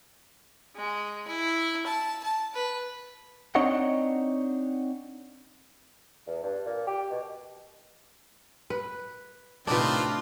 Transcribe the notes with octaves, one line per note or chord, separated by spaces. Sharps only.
G#3
E4
A5
A5
B4
C4 D4 D#4 C#5 D#5 F#5
E2
G2
A#2
G4
B2
B4
A2 C3 D#3 C4 D4 F4 B4